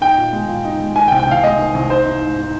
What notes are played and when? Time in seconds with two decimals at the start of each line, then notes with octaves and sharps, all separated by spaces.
0.01 D#4 G5
0.18 A#2
0.33 G#3
0.48 A#2
0.65 D#4
0.80 G#3
0.96 D#3 G#5
1.08 G5
1.12 C2
1.19 G5
1.27 C2 F5
1.43 G#3 D#5
1.59 D#3
1.74 C2
1.89 D#4 C5
2.05 D#4
2.21 G#2
2.37 D#4